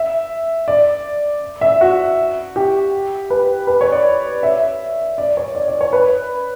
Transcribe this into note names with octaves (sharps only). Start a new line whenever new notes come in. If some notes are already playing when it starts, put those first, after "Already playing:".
Already playing: E5
D5
E5
F#4
G4
B4
B4
C#5
D5
E5
D5
C#5
D5
D5
C#5
B4